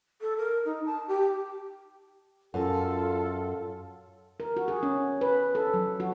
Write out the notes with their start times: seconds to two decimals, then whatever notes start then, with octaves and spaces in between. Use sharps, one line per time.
0.21 A4
0.37 A#4
0.65 D#4
0.86 A5
1.08 G4
2.54 F#2 F4 A4
4.40 A#4
4.57 F#4
4.68 G#4
4.83 C#4
5.21 B4
5.55 A4
5.74 F#3
6.00 F#4